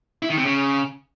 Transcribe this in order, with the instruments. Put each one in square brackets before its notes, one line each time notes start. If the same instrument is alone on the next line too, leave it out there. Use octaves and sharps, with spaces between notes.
[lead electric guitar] E4
D#3
C3
C#3